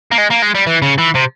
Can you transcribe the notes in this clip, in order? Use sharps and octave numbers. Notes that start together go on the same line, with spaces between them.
A#3
G#3
A#3
G#3
G3
E3
C#3
E3
C3